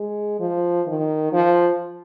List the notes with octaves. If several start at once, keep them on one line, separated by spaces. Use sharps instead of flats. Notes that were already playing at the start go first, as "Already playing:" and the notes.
Already playing: G#3
F3
D#3
F3